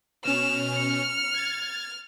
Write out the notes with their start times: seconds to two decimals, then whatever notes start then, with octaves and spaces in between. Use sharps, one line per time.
0.25 B2 C#4 F6 E7
0.76 C#7
1.34 G#6 A6